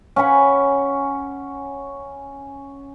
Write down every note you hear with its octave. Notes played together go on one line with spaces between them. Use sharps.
C#4 F#5 G#5 B5